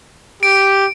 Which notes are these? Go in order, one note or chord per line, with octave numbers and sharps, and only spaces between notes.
G4 D7